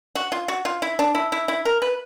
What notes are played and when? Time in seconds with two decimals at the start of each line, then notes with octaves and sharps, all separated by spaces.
0.15 F#4
0.32 F4
0.48 F#4
0.65 F4
0.82 E4
0.99 D4
1.15 E4
1.32 E4
1.48 E4
1.65 A#4
1.82 B4